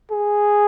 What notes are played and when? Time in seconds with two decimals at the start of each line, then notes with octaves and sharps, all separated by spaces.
0.11 G#4